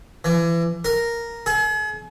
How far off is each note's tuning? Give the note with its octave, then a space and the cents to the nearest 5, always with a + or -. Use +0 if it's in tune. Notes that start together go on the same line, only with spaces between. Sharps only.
E3 +30
A#4 +0
G#4 +40